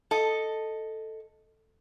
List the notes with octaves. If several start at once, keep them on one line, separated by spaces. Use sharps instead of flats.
A4 D#5